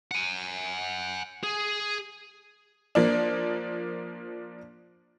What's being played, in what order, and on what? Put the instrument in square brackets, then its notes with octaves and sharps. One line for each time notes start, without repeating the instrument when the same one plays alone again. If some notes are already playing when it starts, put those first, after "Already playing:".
[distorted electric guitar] F#5 G#5
G#4
[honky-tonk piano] F3 A#3 D4